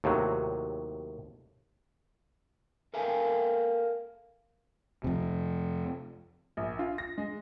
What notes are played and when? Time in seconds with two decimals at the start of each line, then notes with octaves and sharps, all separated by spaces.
0.04 D#2 A2 C3 F#3
2.94 A4 A#4 E5 F5 G5 G#5
5.04 F2 C3
6.57 A#1
6.79 F4
6.98 A#6
7.18 G#3